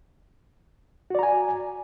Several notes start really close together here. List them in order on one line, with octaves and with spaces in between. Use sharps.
F#4 D5 A#5 G#5